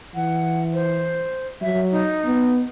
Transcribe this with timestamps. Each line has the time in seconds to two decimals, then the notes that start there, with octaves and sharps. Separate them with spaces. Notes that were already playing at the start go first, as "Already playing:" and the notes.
0.15 E3 F#5
0.73 C5
1.62 F#3 E5
1.92 D#4
2.25 B3